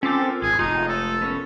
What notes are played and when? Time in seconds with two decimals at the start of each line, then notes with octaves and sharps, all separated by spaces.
0.03 C4 C#4 F4 A4 D6
0.21 F4 A#4
0.42 G#1 G#4
0.59 F1 G#3 A3 D#4 F4
0.88 A4
1.22 B3 C#4 A#4